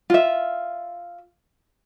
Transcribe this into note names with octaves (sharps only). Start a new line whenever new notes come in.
F4 E5